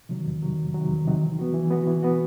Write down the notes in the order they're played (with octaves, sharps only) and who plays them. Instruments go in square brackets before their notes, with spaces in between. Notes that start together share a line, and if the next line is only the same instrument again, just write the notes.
[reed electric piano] C3 D#3 F#3
E2
C3 D#3 F#3
E2
C3 D#3 F#3
E2
C3 D#3 F#3
E3
B3 F#4
E3
B3 F#4
E3
B3 F#4